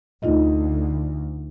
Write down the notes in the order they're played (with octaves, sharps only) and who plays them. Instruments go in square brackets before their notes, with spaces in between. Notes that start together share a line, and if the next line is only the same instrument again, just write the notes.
[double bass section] D2 [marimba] D#4 F4 D#5